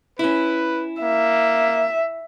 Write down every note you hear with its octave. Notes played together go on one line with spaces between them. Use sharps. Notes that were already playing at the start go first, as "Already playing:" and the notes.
C#4 E4 B4
A#3 E5